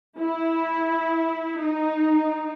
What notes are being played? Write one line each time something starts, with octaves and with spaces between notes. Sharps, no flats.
E4
D#4